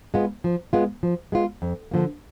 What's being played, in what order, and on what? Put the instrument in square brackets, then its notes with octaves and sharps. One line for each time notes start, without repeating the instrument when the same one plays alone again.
[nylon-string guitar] G#3 B3 F4
F3
G#3 B3 F4
F3
G#3 B3 F4
F2
D3 F3 A#3